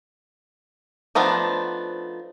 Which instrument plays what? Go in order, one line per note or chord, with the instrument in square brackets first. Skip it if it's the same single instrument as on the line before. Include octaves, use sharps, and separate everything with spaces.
[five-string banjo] F3 A3 B3 D4 D#4